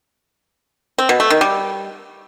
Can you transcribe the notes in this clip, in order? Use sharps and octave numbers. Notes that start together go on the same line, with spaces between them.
C4
B2
A3
D#3
G3